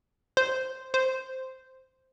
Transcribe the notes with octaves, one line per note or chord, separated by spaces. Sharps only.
C5
C5